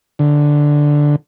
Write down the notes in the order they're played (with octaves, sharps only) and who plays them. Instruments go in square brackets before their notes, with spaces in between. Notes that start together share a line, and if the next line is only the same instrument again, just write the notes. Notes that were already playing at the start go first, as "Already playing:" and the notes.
[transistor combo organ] D3